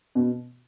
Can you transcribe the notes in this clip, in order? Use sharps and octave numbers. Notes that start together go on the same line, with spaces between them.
B2